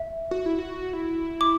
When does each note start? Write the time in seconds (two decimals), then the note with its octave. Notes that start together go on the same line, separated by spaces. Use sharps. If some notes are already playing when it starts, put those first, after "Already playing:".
Already playing: E5
0.31 F#4
0.46 E4
0.59 F#4
0.93 E4
1.41 D6